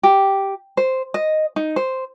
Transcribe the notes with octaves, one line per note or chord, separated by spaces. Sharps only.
G4
C5
D#5
D#4
C5